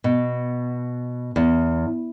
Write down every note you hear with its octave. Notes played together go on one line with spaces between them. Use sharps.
B2
E2